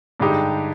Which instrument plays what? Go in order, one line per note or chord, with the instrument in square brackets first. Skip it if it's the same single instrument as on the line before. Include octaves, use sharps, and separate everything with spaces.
[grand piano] G2 D3 G#3 D#4 G4